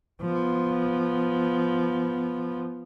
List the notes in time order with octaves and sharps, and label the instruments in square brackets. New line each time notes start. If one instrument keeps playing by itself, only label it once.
[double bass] F3 B3